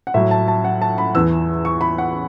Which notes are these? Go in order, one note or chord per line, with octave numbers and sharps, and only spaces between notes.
F#5
A2 F#3 E5
A5
A5
F#5
A5
B5
E2 E3 E6
C#6
B5
F#5